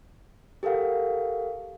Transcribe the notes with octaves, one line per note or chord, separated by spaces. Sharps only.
G4 A4 A#4 F5 F#5